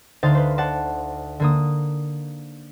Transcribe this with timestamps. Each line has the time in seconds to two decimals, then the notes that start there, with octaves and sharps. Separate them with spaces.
0.23 D2 D3 D#4 C5 F5 A6
0.35 B4 C5
0.58 C5 D5 F#5 A5
1.40 D3 A#3 D#6